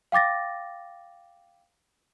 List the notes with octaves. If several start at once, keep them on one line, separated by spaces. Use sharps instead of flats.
F5 G5 D6 A6 A#6